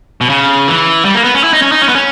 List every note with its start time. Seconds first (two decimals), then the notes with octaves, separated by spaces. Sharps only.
0.21 B2
0.29 C#3
0.68 E3
1.05 G3
1.15 A#3
1.24 B3
1.34 C#4
1.44 E4
1.53 D#4
1.62 C#4
1.72 D#4
1.82 C#4
1.89 B3
1.95 C#4